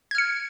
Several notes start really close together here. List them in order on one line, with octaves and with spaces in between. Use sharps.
G#6 F6 C#7